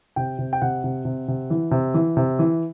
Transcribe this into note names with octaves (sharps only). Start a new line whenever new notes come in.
C3 G5
C3
G5
C3 F#5
C3
C3
C3
E3
C3
E3
C3
E3